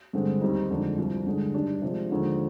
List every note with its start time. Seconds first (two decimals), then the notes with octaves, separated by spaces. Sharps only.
0.13 G2 D3 G#3 C4
0.41 D#2 D#3 G3 C4 D#4
0.70 F2 D3 G#3 D4
0.98 C2 C3 F3
1.26 G2 D3 G#3 D4
1.54 G2 D#3 G3 D4
1.82 C3 F3 G#3 D4
2.10 D#2 D3 F3 G#3 D4